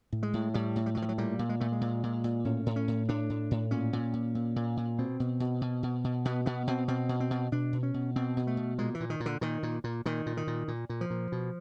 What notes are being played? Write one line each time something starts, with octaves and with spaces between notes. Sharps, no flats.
A2
G#3
A2
A2 G3
A2
G3
A2 F#3
F3
F#3
A#2 G3
A#2
G#3
A#2 A3
G#3
A#2
A#2
A#2
A2 C#4
A2
C#4
A2
A2 D4
A2
A2
A#2 C#4
A#2
A#2
A#2
A#2
A#2
B2 C4
B2
B2
B2
B2
B2
B2 B3
B2 B3
B2 C4
B2 C4
B2
C4
B2
B2 D4
B2
C#4
B2
B2 C4
B2
A3
B2
A#2 G#3
E3
A#2
D#3
A#2
D3
A#2 D#3
A#2
A#2
A#2 D#3
A#2
D#3
A#2
A#2
A#2
F3
A#2
B2